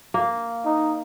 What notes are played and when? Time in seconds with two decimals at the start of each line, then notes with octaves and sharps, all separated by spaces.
0.14 A#3
0.66 D#4